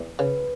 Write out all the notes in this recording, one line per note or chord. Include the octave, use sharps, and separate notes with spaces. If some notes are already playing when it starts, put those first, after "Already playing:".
Already playing: E2
C#3 B4